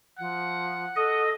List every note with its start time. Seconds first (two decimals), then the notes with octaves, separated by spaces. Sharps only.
0.19 F3 F#5
0.96 A4 D#5